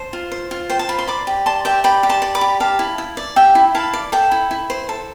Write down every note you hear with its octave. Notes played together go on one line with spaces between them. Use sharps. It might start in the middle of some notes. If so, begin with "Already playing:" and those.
Already playing: C5 A5
F4
C5
F4
C5 G5
A5
F4 B5
C6
D5 B5 D6
G4
D5 A5 C6
G4 E5 G5
D5 G5 B5
G4
A5 C6
D5
B5 D6
G4
G4 F5 A5
E4
E4
D5
G4 E5 G5
E4
E4 F5 A5
D5
A4 E5 G5
E4
E4
C5
A4